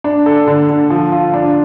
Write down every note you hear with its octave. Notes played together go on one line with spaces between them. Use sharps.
D4
A4
D3
D3
F3
F4
D4